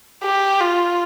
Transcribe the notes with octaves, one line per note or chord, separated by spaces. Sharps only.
G4
F4